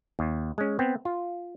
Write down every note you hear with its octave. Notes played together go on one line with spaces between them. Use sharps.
D#2
G#3 C#4
B3 C4
F4